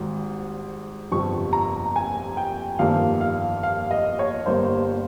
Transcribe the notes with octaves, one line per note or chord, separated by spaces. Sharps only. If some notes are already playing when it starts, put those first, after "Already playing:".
Already playing: G#1 G#2 G3
G1 F2 C3 C#6
A#5
G#5
G5
G1 F2 D#3 G3 A#3 F5
F5
F5
D#5
C#5
G1 G2 G3 A#3 C5